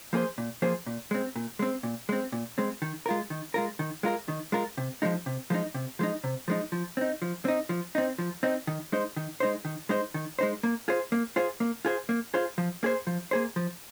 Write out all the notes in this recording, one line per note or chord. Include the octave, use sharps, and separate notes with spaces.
F3 A#3 G#4 C5
A#2
F3 A#3 G#4 C5
A#2
G#3 C4
A#2
G#3 C4
A#2
G#3 C4
A#2
G#3 C4
D#3
G#3 F4 A#4
D#3
G#3 F4 A#4
D#3
G#3 F4 A#4
D#3
G#3 F4 A#4
C3
F3 G#3 D#4
C3
F3 G#3 D#4
C3
F3 G#3 D#4
C3
F3 G#3 D#4
F3
C4 D#4
F3
C4 D#4
F3
C4 D#4
F3
C4 D#4
D#3
G#3 D#4 C5
D#3
G#3 D#4 C5
D#3
G#3 D#4 C5
D#3
G#3 D#4 C5
A#3
F4 G#4 C5
A#3
F4 G#4 C5
A#3
F4 G#4 C5
A#3
F4 G#4 C5
F3
A#3 G#4 C5
F3
A#3 G#4 C5
F3